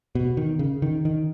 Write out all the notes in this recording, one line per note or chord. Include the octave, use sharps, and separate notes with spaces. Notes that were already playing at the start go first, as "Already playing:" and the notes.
B2
D#3
C#3
D#3
D#3